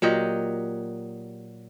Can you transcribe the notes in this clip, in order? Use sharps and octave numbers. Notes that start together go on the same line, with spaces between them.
A#2 F#3 G4 D#5